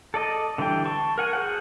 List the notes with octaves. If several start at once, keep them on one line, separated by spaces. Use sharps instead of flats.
A4 D5 D#5
D3 E3 G3 G4 G5
A5 C6 C#6
A#4 F#5 G#5
F#4 G#4 C5 F#5